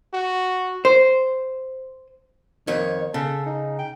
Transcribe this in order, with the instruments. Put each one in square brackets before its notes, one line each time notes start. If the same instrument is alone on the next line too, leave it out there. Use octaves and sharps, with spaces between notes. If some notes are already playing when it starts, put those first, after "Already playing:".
[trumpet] F#4
[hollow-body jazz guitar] C5
[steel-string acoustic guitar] F2 C#5 [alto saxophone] D#3
[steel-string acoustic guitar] C#3 [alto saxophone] A4
[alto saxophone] D#4
G5